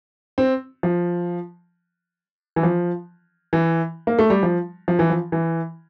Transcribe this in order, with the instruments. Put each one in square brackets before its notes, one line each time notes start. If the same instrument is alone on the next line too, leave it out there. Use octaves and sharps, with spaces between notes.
[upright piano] C4
F3
E3
F3
E3
A#3
A3
G3
F3
F3
E3
F3
E3